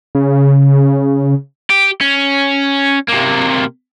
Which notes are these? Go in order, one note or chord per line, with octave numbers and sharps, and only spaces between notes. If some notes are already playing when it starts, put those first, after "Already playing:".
C#3
G4
C#4
C3 A#3